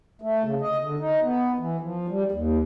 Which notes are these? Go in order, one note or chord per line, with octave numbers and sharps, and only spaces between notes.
A3
C#3
D#5
D3
D#4
B3
E3
F3
G3
D#2